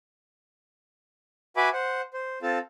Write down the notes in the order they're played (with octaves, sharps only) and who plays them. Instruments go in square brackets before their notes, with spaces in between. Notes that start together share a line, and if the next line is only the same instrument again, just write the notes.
[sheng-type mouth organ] F#4 B4 E5 G#5 B5 D6
C5 F#5
C5
C4 F4 A4 A5